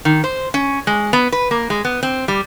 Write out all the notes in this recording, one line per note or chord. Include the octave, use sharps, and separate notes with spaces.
D#3
C5
C#4
G#3
B3
B4
A#3
G#3
B3
C4
G3